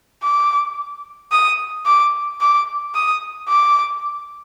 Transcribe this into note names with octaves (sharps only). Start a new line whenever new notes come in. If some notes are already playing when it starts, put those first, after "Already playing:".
D6
D#6
D6
D6
D#6
D6